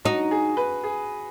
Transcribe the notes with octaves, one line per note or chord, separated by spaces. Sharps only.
D#4 F#4
G#4
B4
G#4